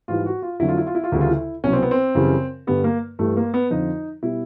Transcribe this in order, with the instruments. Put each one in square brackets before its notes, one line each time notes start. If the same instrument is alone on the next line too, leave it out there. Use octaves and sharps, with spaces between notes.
[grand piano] G#2 E3 G3 F4
F#4
F4
F2 D3 F#3 E4
F4
E4
F4
E4
F4
D2 C#3 E3 G3 E4
F4
E4
C2 B2 F#3 C#4
C4
B3
C4
F#2 C#3 E3 G3
G2 D3 G3 B3
A#3
G2 E3 G3 A3
A#3
B3
F2 D3 F3 D#4
B2 G3 E4